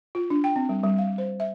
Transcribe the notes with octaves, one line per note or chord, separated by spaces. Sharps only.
F4
D4
G5
C4
G3
G3
F5
C5
E5